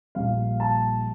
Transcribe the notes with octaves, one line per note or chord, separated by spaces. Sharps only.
A#1 A#2 G3 F5
A5